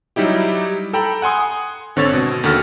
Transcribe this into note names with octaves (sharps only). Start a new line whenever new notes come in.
F#3 G3 D#4 E4 G4
A4 G5 A#5 B5
F#5 G#5 C6 D#6
G#1 D3 C4 C#5 E6 A6
B2
D#2 D3 F#4 A4 F6 A6